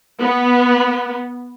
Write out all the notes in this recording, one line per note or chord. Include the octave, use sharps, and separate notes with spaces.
B3